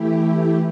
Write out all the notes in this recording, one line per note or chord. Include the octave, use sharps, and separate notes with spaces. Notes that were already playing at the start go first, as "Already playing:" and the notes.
Already playing: E3 A3 E4 G4